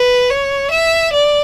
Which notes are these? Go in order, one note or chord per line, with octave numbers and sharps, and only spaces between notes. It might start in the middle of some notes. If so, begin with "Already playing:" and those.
Already playing: B4
C#5
E5
D5